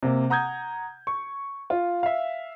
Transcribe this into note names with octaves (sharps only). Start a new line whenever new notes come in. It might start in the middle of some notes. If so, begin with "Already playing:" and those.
C3 A#3
F#5 A#5 D#6 G6 G#6
C#6
F4
E5 F5